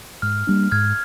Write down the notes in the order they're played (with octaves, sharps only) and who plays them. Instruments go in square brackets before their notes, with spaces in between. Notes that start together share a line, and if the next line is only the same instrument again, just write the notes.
[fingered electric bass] G#2 [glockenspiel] F6
[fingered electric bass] G3 A#3 D4
[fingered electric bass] G#2 [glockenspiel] F6 G#6